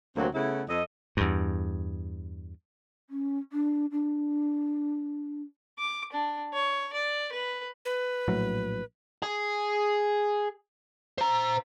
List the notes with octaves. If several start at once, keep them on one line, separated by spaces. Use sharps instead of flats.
D2 C3 F#3 A#3 C4
C#3 A3 B3 E4
F2 A4 D#5
E2 G2
C#4
D4
D4
D6
D4
C#5
D5
B4
B4
A#1 A2 F#3
G#4
C5 A#5